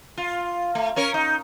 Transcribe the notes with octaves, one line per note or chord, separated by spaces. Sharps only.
F4
A3
C#4 A#4 C#5
D#4